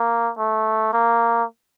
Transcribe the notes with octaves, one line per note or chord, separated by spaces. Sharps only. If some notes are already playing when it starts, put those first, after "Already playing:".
Already playing: A#3
A3
A#3